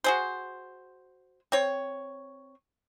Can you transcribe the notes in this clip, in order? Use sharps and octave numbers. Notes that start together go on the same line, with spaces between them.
F#4 G#4 C5
C4 C#5